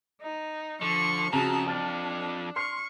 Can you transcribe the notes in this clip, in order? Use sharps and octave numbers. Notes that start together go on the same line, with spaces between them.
D#4
D3 F3 C#6
F2 C#3 F#4 A5 A#5
D4 A5 F6 A6
C6 C#6 F6 C7